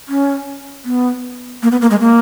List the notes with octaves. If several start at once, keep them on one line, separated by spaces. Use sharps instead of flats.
C#4
B3
A#3
B3
A#3
G#3
A#3